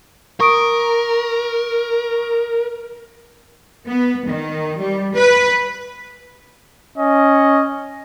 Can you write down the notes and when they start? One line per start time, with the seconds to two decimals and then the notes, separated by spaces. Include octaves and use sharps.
0.40 A#4 C#6 D#6 D7
3.87 B3
4.27 D#3
4.79 G3
5.14 B4
6.98 C#4 D#5